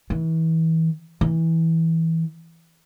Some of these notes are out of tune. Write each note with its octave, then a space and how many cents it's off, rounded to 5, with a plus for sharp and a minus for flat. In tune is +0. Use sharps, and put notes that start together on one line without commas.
E3 -30
E3 -15